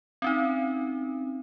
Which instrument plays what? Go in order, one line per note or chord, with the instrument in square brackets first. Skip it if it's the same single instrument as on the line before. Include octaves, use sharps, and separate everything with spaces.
[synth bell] C4 C#4 D#4